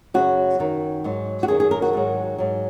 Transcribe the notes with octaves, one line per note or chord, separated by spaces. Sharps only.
F#2 C#3 F#3 F#4
F#2 D#3 F#3
G#2 F#3
F#4
F#2 D#3 F#3 G#4
G#4
A#4
F#4
G#2 D#3 F#3
G#2 F#3